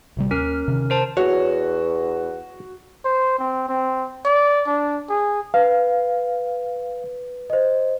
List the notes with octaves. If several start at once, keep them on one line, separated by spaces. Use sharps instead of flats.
A1 C3 G3
D#2 C#4 A#4 F6
C3 D#3
A#4 C5 A5
E2 F#4 C#5
C5
C4
C4
D5
D4
G#4
B4 F5
C5 D#5